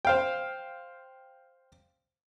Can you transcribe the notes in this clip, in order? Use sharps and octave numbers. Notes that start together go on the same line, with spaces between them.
C5 F5 G5